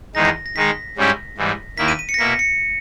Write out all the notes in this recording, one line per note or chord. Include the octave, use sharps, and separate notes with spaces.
E2 D#3 G#3 D#4 A#6
A#6
D#3 G#3 D#4 B6
G#2 G3 C#4 E4 G4
G#2 E3 G3
D#2 D#3 A#3 E4 B6
D#7
D#7
C#7
A#6
B2 A#3 E4 B6
C#7